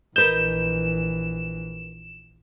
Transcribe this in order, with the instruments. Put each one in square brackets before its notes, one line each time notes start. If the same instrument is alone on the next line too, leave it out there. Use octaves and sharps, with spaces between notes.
[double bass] A#1 E3 [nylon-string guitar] A#4 B4 D#5 [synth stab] G6 [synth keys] E7